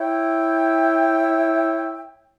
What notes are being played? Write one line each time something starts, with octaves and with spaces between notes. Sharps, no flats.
E4 C#5 E5 G5